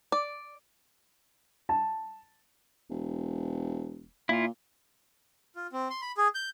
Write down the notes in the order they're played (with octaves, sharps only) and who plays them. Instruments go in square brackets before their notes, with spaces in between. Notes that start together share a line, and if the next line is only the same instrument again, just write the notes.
[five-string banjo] D5
[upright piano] A5
[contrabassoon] E1
[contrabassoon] A#2 [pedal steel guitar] E4 F4
[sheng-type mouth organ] F4
C4
C6
B5
G#4
G6